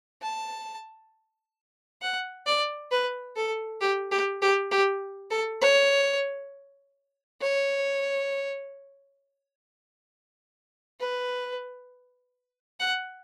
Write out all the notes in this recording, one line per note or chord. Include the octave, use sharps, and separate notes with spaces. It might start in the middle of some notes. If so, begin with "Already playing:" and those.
A5
F#5
D5
B4
A4
G4
G4
G4
G4
A4
C#5
C#5
B4
F#5